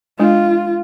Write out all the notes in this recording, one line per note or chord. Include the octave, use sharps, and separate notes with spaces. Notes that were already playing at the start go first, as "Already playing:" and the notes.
G#3 D4 F4